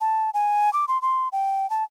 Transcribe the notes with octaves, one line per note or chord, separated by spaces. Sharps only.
A5
G#5
D6
C6
C6
G5
A5